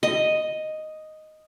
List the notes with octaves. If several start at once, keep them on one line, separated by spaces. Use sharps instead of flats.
D#5